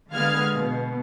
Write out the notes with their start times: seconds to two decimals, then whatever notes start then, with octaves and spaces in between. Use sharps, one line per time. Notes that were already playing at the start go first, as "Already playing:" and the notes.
0.12 D3 G#3 B3 F5 F6 G#6
0.53 B2